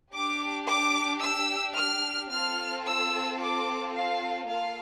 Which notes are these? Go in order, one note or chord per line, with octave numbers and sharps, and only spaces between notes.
D4 G4 D6
D6
E6
F6
C4 F4 A4 F6
E6
D6
F5
A#3 F4 A4 F5